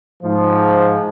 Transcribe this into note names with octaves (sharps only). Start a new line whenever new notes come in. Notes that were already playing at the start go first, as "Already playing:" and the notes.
G#2 F3